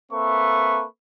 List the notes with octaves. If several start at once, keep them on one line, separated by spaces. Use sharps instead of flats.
A#3 C4 A4 B4 E5 C#6